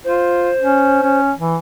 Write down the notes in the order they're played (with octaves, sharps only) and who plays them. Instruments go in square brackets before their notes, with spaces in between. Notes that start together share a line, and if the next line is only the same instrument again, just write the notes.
[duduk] F4 [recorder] C5
[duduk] C#4
C#4
E3